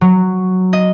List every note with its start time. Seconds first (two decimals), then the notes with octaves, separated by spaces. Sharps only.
0.01 F#3
0.73 D#5